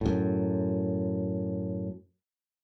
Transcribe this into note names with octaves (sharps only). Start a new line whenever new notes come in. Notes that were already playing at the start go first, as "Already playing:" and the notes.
F#2 A2